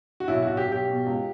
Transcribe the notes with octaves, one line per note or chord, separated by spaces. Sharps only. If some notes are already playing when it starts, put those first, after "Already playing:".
F#4
B1 E4
B1 F#4
G4
B1
G4
B2
C#2